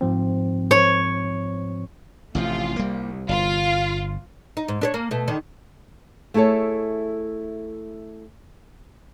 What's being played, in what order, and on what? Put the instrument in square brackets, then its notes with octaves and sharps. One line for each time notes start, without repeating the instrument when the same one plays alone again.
[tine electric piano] G#2 F3 C4
[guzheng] C#5
[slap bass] A1 C3 F3 [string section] A3 F4
[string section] C2 [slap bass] G3 A#3
[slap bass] G1 [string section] F4
[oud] D#4
G#2
D4 B4 C#5
A#3
B2 A3
D3 D#3
[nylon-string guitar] A3 E4 G#4 A4 C#5